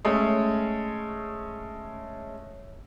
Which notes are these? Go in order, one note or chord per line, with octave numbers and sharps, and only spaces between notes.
G#3 A3 C#4